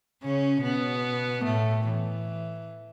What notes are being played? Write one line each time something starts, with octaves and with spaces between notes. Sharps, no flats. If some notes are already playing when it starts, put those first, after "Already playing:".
C#3 C#4
B2 B3
A2 A3
E3